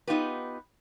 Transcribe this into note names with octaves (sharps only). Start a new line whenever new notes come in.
B3 D#4 F4 G4 B4